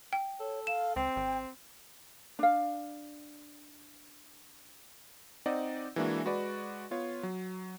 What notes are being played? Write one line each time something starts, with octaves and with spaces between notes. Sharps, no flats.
G5
A4 C#5
F5 E7
C#2 C4 G5
G#1
D4 F5
C4 D#4 D5 D#5 F#5
E3 G#3 A#3 D4 E4 F#4
G#3 F#4 B4 D5
B3 F4 C#5
F#3